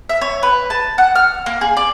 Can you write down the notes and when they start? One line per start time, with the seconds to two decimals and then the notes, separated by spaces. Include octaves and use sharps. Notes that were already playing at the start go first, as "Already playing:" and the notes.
0.09 E5
0.21 C#5
0.43 B4
0.70 A5
0.98 F#5
1.15 F6
1.46 A#3
1.61 G#4
1.77 D5